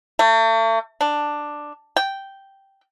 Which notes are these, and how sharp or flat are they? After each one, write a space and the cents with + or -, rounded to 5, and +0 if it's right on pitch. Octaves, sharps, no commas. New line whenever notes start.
A3 +40
D4 +5
G5 -5